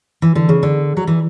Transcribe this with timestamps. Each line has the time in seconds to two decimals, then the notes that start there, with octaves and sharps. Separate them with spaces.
0.22 E3
0.35 D3
0.49 C#3
0.63 D3
0.97 F#3
1.07 E3